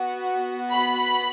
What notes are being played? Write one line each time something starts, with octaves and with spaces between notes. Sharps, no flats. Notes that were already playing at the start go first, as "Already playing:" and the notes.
Already playing: B3 F#4
B5